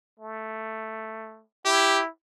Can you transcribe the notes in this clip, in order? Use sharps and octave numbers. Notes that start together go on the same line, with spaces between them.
A3
E4 G4